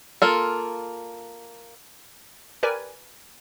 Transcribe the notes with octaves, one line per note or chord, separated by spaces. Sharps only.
A#3 F4 A4
G4 A#4 B4 D5 G#5